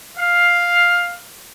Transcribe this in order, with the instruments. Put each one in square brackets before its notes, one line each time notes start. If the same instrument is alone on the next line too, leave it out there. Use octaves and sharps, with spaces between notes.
[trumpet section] F5